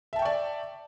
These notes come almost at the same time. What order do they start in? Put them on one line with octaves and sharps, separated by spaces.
E5 A5 G5 C#6 D5